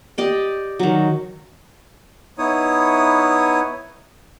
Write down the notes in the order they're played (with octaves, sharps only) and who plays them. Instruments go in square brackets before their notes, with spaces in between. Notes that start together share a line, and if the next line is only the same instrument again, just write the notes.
[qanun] G4 D5 D#5
D#3 F#3
[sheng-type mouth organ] B3 D#4 E4 C#5 D#6